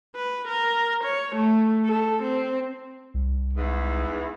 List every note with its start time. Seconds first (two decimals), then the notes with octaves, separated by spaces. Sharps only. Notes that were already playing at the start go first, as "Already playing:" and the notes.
0.16 B4
0.48 A#4
1.04 C#5
1.36 A3
1.86 A4
2.23 C4
3.14 C2
3.54 E2 G#2 E3